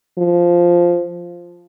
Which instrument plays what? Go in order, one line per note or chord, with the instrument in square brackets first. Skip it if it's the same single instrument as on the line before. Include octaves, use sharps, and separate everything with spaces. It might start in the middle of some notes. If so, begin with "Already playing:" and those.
[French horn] F3